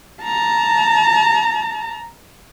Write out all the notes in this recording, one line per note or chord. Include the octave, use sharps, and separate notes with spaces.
A5 A#5